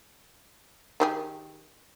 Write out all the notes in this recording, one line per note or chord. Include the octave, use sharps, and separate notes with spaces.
D#3 G4 G#4